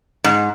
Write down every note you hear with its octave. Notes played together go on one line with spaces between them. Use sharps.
G#2